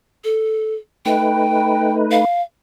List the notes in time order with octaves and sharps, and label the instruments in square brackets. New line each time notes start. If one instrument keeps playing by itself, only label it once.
[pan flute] A4
[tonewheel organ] A3 D#4 B4 [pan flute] G5
[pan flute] F5